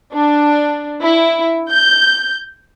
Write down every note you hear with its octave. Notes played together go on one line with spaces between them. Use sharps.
D4
E4
G6